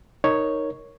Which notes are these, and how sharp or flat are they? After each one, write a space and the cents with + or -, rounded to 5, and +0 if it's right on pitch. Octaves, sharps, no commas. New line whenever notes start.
D#4 +0 A#4 +0 C#5 +0